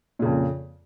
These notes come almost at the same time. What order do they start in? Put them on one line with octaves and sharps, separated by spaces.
A#2 C#3 F2